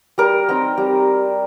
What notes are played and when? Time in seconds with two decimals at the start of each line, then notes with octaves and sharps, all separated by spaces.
0.18 G3 A#4
0.49 C4 D#4
0.78 G3